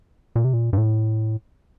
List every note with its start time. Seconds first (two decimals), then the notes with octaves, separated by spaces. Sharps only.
0.36 A#2
0.45 C3
0.53 A#2
0.73 G2
0.78 A2